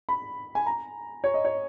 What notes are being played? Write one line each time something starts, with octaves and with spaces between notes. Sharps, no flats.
B5
G#5
A#5
C#5
D#5
C#5